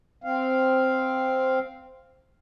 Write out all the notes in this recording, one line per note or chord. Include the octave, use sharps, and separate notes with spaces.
C4 F5